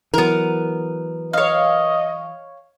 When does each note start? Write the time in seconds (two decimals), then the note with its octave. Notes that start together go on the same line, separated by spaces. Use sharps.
0.14 E3 F#3 B3 A#4
1.33 C#5 D#5 F5